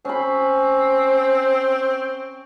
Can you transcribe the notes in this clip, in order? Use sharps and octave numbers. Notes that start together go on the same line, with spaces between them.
C4 C#4 B5